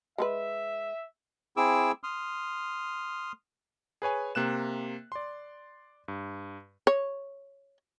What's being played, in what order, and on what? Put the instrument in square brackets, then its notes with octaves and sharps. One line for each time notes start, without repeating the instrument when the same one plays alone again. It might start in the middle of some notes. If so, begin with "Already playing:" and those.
[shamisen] G#3 A4 B4 [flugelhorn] E5
[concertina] C4 E4 G#4 D6 E6
C6 D#6 F6
[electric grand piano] G#4 B4 C#5 G#5
C3 A#3 F#6 E7
D5 C6
G2
[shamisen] C#5